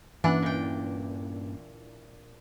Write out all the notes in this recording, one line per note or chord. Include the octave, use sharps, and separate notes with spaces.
G2 E3 A#3 C#4 D4 F#5
A#2 G5